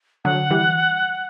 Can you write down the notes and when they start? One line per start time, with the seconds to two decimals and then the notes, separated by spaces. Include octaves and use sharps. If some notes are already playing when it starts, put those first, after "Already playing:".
0.25 D3 F#3 F#5
0.50 E3 G3